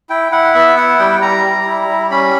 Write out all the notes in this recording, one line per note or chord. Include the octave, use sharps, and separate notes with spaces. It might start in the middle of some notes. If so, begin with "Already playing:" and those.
E4 G5
E4 F#5
B3 E5
E4 F#5
G3 G5
G3 A#5
G3
E4
G3
C#4 B5